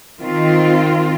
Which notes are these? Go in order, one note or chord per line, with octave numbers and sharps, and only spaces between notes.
D#3 C4 F4